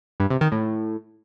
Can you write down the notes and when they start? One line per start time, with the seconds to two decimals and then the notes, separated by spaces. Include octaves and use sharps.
0.20 G2
0.30 C3
0.41 D#3
0.52 A2